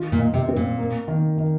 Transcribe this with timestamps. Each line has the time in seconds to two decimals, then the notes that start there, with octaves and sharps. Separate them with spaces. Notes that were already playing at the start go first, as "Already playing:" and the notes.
Already playing: D#3 F4
0.12 A#2
0.19 D#5
0.34 C3
0.49 C4
0.56 A#2
0.78 A#3
1.08 D#3
1.38 D#3